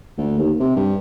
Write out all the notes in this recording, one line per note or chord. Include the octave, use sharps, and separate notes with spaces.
D2
D#2
C3
G2